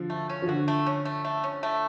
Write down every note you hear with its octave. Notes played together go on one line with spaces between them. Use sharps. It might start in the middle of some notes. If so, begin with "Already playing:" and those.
Already playing: D3 F3
A3
C#4
F3
D3 F#4
A3
C#4
A3
A3
C#4
A3